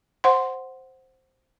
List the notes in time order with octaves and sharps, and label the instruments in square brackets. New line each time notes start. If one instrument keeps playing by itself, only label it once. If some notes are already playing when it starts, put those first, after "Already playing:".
[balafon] C5 F#5 C6